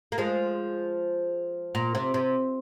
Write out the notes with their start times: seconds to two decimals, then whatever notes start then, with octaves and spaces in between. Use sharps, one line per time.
0.12 A#3
0.18 F3 G#3
1.75 A#2
1.95 C3
2.14 C3